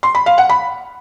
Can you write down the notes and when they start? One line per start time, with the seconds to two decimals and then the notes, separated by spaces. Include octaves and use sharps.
0.03 C6
0.15 B5
0.26 F5
0.38 F#5
0.49 B5